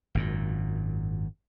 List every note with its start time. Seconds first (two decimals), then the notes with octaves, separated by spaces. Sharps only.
0.15 G#1 F#2 A#2